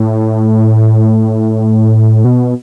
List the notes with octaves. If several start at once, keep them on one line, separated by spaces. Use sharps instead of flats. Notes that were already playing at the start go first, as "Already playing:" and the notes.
Already playing: A2
B2